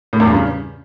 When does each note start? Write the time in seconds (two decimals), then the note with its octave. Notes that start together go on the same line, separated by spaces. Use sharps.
0.13 A2
0.20 E2
0.27 G2
0.35 C#3